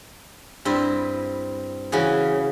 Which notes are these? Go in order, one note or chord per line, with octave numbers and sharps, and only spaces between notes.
G2 C4 E4
C#3 E3 F#4 G#4